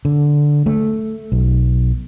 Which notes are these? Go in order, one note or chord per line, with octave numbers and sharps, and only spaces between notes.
D3
A3
B1